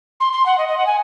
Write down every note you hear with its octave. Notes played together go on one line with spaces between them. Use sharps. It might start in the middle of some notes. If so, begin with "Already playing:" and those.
C6
C6
F#5
D#5
D#5
F#5
G#5